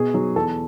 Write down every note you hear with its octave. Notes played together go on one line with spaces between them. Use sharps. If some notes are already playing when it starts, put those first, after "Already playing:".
Already playing: B2 G#4
F#3
E2 A4